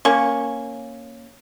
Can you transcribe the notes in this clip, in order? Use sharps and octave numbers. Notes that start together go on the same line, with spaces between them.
A#3 C#4 C#6